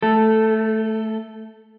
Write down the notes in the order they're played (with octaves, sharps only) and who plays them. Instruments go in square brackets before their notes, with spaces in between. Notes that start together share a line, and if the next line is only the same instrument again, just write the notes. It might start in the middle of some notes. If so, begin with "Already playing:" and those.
[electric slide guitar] A3 A4